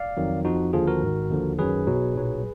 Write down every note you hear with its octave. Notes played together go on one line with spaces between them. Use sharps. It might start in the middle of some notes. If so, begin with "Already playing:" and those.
Already playing: D5 F5
F2 D#3 F#3
F2 F3 D#4 F#4
D#2 D3 F3 F4 G#4
F#4 A#4
G#1 G#2 D#3
D#2 D3 F3
F#2 D#3 F#3 G#4 B4
B1 B2 F#3
B1 A#2 F#3